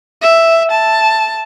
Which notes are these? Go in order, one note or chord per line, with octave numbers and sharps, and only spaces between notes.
E5
A5